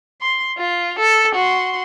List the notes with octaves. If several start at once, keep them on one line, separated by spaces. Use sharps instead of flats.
C6
F4
A4
F#4 C6